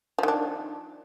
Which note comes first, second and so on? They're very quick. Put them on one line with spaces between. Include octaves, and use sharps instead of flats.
F3 D#3 D4